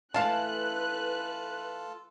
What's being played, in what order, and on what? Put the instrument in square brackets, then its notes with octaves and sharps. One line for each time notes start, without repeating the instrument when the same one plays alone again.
[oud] E3 A3 [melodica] F4 A4 [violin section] B4 F#6 [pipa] F5 A5